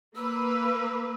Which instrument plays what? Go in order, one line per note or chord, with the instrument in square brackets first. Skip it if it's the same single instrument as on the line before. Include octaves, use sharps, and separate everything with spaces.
[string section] A#3 B4 [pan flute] E6